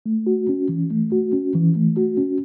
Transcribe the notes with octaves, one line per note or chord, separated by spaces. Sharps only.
A3
F#4
C#4
E3
A3
F#4
C#4
E3
A3
F#4
C#4